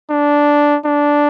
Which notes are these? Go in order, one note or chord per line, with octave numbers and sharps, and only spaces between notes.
D4
D4